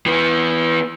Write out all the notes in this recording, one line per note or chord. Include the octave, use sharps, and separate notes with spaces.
E3 B3